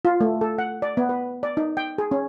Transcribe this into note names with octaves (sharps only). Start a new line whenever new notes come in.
F4
A3
A4
F#5
D5
B3
B4
D5
D#4
G5
G#4
C#4